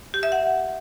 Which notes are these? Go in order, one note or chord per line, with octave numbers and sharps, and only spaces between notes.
G4
E5
F#5